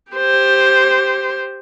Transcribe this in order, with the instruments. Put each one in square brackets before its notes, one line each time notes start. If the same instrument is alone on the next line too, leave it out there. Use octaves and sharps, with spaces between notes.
[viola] G4 C5